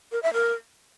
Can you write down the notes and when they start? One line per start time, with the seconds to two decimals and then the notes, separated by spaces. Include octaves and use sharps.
0.12 A#4
0.23 E5
0.34 A#4